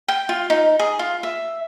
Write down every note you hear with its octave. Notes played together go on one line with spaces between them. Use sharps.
G5
F4
D#4
G#4
F4
E5